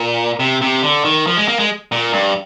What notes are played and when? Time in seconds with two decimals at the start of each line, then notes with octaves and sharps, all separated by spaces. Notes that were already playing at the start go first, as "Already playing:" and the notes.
Already playing: A#2
0.39 C3
0.61 C3
0.83 D3
1.05 D#3
1.27 F3
1.37 G#3
1.48 A#3
1.59 G#3
1.92 A#2
2.13 G2